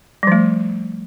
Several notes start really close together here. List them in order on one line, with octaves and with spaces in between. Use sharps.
G3 F3 A3